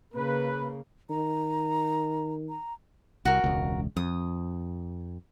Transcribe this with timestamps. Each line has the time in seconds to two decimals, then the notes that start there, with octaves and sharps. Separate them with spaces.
0.14 C#3 A#3 B4
1.10 D#3 A#5
2.49 A#5
3.25 C2 F#4 A#4
3.44 E1 C#2
3.97 F2 D#6